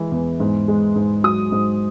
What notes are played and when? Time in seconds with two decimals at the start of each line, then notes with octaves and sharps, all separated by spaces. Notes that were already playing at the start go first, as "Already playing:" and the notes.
Already playing: E3 G#3
0.12 E2
0.40 G#2
0.68 G#3
0.96 G#2
1.24 F#3 D#6
1.52 G#2